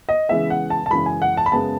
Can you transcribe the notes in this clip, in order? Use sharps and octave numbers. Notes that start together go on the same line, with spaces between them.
D#5
C#3 E3 G#3 B3 E5
F#5
A5
A5
F#2 C#3 E3 G#3 B5
G#5
F#5
A5
B5
F#2 C#3 G#3 B3 A5